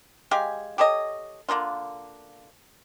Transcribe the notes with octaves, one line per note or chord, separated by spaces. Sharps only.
G#3 G4 F5 G#5
G4 A4 C#5 D#5
D3 A#3 D#4 F4